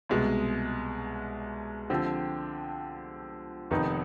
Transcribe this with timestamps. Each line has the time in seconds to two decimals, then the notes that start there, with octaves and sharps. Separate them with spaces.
0.09 C2 B2 G#3
1.90 D3 F3 C4 G4
3.71 F1 F2 D#3 B3 D#4